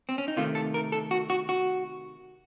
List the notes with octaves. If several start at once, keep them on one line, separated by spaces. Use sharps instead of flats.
C4
C#4
D#4
C3 D#3 A3 F4
A4
A#4
A4
F#4
F#4
F#4